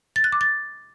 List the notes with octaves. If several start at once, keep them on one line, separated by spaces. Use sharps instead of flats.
A6
F#6
D6
A6